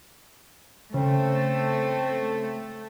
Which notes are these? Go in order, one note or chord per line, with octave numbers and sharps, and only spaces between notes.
C#3 A3 C4